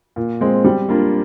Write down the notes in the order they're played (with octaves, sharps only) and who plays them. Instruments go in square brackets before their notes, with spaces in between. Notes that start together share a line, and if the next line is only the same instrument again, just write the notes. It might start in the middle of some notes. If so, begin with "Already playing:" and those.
[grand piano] A#2
G#3 C4
G3
A#3 D4 F4